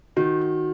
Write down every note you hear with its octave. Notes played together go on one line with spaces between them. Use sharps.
D#3 F#4
F#4